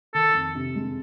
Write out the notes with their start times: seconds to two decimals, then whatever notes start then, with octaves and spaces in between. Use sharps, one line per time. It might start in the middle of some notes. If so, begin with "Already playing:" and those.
0.14 D#3 A4
0.35 F2
0.55 C3
0.76 G#3